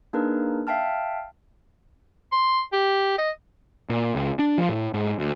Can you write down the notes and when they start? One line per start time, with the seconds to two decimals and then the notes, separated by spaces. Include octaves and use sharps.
0.13 A#3 D4 D#4 G#4 A#4 B4
0.67 E5 F5 G5 A5 F6
2.32 C6
2.73 G4
3.18 D#5
3.89 A#2
4.15 C#2
4.39 D4
4.58 F3
4.69 A2
4.94 G#2
5.19 D2